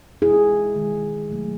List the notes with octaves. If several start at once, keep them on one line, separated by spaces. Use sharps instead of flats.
B2 G#3 E4 G#4
D#3 G#3
B2 F#3 A3